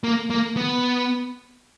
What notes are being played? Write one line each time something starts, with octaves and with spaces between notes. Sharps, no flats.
A#3
A#3
B3